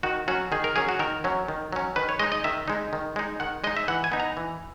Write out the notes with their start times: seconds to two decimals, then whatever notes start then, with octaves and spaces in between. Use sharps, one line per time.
0.03 D#3 F#4
0.28 F#3 C#4 F#4
0.52 D#3 G#4
0.64 A#4
0.76 F#3 C#4 G#4
0.89 F#4
0.99 D#3 A#4
1.24 F#3 C#4
1.48 D#3
1.73 F#3 C#4
1.96 D#3 B4
2.09 C#5
2.19 G#3 D#4 D#5
2.32 D#5
2.44 D#3 E5
2.68 G#3 D#4
2.93 D#3
3.16 G#3 D#4
3.40 D#3 F#5
3.64 G#3 D#4 D#5
3.77 E5
3.88 E3 F#5
4.04 G#5
4.12 B3 D#4
4.20 A#5
4.37 E3